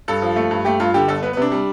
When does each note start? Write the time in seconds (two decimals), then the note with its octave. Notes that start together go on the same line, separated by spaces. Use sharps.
0.08 G2 A4
0.22 F3
0.36 A3
0.51 G2
0.65 A3 G4
0.80 G2 F4
0.94 D3 G4
1.08 G1 A4
1.23 B3 B4
1.33 B4
1.37 C3 D4
1.52 G3